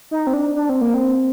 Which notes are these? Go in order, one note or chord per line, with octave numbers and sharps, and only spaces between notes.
D#4
C4
D4
D4
C4
A#3
C4